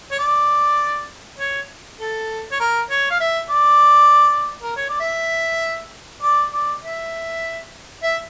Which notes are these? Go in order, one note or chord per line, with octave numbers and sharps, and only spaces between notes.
C#5
D5
C#5
A4
C#5
A#4
C#5
F5
E5
D5
A#4
C#5
D5
E5
D5
D5
E5
E5